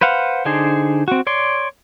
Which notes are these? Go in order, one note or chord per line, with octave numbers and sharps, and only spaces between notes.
B4 C5 F5 F#5
D3 D4 D#4 G#4 C5
C4 F#4
C#5 D5 C6